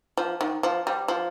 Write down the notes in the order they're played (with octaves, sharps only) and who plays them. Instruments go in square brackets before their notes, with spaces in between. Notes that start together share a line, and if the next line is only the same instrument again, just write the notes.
[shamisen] F3
D#3
F3
G3
F3